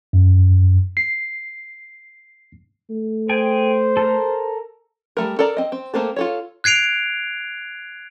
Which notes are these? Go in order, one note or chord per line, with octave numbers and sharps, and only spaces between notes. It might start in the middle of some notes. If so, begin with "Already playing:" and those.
F#2
C7
A3
G#4 C5 G5 G#5
A4 A#4
G3 A3 A#4
A4 A#4 D5 A#5
C4 D#5
C4
A3 A#3 C4 A4
F4 A4 C#5
F#6 G#6 C7 D7 F7